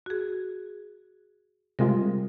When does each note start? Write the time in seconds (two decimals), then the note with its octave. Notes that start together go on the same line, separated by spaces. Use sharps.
0.06 F#4 G#4
1.79 C3 G3 G#3 F4 A#4